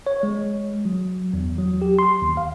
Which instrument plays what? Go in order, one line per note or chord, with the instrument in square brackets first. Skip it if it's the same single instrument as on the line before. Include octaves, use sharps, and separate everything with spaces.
[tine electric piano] C#5
G#3
F#3
E2
F#3
G4
C6
D#2
F5